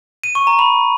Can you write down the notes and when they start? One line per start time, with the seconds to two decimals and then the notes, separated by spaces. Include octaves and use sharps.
0.24 D#7
0.35 C#6
0.47 A#5
0.59 B5